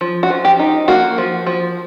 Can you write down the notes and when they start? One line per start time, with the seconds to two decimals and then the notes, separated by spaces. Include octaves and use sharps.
0.01 F3
0.23 F#4
0.30 F3
0.45 G4
0.59 D#4
0.88 A#3 F#4
1.18 F3
1.46 F3